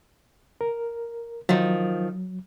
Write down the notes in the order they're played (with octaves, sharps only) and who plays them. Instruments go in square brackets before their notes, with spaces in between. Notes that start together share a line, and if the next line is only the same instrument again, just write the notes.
[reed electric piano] A#4
[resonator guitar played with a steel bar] D#3 F3 [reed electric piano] F#3